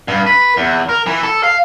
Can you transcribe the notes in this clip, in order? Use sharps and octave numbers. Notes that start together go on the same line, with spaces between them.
G2
B4
E2
A#4
E3
A4
F5